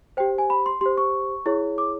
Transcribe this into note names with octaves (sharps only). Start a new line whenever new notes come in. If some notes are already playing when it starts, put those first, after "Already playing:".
G4 C5 G5
G#5
B5
C6
G4 C5 C6
C#6
E4 G#4 C#5
D6